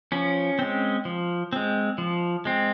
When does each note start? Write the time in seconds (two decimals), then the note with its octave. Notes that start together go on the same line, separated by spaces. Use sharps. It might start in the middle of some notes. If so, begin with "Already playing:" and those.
0.12 F3 C#4
0.59 G#3 C4
1.05 F3
1.53 G#3 C4
1.98 F3
2.45 G#3 C4